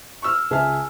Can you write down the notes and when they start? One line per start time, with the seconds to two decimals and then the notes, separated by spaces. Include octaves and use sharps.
0.22 C#6 E6 F6
0.51 C#2 G#4 E5 A5 F6